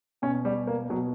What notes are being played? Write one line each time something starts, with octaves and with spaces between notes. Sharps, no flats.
B2 C#4
G3
A#3
B2 F#3